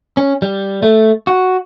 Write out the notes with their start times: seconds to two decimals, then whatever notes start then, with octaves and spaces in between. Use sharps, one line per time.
0.17 C#4
0.42 G3
0.83 A3
1.27 F#4